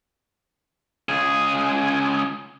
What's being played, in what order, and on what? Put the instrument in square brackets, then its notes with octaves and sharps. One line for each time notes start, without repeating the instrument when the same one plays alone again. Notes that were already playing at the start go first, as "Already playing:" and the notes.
[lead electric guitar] C#2 G#4